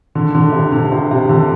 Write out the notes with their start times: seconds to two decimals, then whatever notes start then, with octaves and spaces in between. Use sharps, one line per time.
0.15 D3
0.35 D3
0.53 C3
0.72 D3
0.92 C3
1.11 C3
1.29 D3